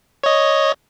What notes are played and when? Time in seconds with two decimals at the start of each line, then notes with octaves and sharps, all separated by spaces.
0.24 C#5 D#5